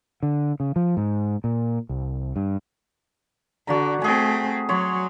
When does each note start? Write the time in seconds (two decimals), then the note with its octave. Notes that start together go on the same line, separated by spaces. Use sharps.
0.23 D3
0.60 C#3
0.76 F3
0.97 G#2
1.44 A#2
1.89 C2
2.36 G2
3.67 D3 F#4 D5 A#5
4.02 A3 C4 G#4 G#5
4.69 F#3 C#5 C6